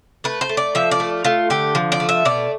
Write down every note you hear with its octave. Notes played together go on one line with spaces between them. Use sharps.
A3 B4
C5
A3
D5
F3 E5
D5
A3
A3 F4
D3 G4
F3
D5
A3
E5
B2 D5